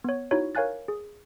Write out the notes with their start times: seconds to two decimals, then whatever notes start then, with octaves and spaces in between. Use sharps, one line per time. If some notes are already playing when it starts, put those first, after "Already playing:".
0.04 B3 C#5
0.31 D#4 E4 F#4 C#5
0.55 A#4 C#5 F5 G#5 F#6 A6
0.88 G#4